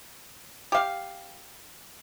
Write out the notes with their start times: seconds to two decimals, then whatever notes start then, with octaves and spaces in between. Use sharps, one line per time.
0.72 G4 F5